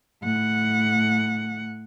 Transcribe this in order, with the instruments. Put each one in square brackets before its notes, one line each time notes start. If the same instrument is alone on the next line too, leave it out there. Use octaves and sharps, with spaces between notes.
[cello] A2 F#5